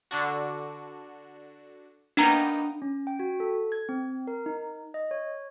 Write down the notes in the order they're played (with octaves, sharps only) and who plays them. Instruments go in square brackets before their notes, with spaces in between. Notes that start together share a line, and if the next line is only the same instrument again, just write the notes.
[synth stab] D3 D4 F#4
[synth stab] A#3 B3 D#4 [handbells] D4 A#5
[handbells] C#4
G5
F#4
A4
G#6
C4
A#4
D#4
D#5
C#5